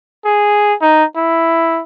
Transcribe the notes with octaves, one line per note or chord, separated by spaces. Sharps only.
G#4
D#4
E4